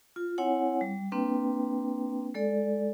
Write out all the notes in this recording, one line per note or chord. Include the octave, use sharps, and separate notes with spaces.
F4
C4 E4 C#5 F#5 G#5
G3
A#3 C4 D4 B4 G5
G#3 A4 D5